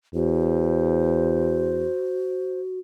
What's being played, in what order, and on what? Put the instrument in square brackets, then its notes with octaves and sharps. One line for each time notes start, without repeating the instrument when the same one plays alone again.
[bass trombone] E2 [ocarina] F#4 [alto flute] C5